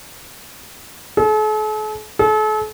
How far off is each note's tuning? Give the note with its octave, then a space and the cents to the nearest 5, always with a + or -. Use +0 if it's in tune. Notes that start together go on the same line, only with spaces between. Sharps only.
A4 -45
A4 -40